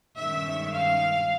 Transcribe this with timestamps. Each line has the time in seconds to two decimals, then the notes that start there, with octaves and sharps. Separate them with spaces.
0.18 G2 D#3 G#3 C#4 E5
0.72 F5